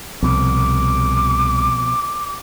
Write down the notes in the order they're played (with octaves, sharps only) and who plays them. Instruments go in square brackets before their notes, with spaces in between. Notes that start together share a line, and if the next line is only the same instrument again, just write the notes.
[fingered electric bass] C2 [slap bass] B2 F3 C4 [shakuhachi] D6